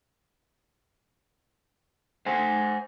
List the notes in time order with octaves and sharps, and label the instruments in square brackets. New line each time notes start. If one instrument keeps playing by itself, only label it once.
[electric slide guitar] C5 F#5 G#5